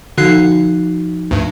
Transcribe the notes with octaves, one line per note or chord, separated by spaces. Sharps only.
D3 F3 D#4 F#4 F#6 C7
D2 G2